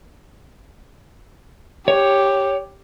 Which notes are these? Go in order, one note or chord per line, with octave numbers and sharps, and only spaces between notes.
G4 C#5